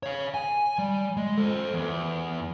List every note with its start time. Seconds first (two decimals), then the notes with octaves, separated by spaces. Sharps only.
0.03 C#5 F5
0.34 G#5
0.79 G3
1.17 G#3
1.38 A4 C5
1.73 E2